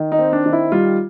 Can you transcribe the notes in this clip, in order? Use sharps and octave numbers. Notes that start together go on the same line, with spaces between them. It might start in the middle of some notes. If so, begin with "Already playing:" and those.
Already playing: D#3
D#4
C4
D4
D#3
E4
G3 F4